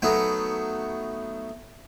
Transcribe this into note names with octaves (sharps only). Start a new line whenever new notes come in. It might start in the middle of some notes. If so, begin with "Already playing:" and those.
F#3 A3 B3 D#4